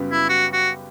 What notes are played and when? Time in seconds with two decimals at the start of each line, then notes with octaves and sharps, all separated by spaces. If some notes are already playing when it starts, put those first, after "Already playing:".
Already playing: F#2 C#3 G3 B3 F#4
0.12 E4
0.29 F#4
0.53 F#4